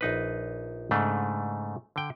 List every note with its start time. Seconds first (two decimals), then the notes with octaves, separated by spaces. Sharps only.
0.01 A#1 D#4 B4
0.91 G#2 C#3 A3 D4
1.96 D3 G5